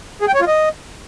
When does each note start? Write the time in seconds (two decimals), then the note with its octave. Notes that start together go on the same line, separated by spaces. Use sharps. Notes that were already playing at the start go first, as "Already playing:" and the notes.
0.21 G#4
0.28 G5
0.34 C#5
0.41 F4
0.47 D#5